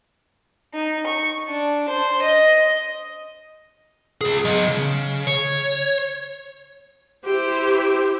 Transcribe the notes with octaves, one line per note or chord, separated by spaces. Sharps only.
D#4
C#6
D4
C5
D#5
C#2 G#4
F#3 D#5
C#3
C#5
E4 G4 C5